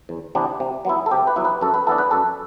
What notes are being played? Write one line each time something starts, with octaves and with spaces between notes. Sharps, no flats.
E2
C3 E3 B3 D4
C3
F#3 B3 E4
A4
C3 G4
B4
F#3 B3 E4
B4
F#2 A4
B4
E3 B3 D4 A4
B4
F#2 A4